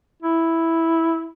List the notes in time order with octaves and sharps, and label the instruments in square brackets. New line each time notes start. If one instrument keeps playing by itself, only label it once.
[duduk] E4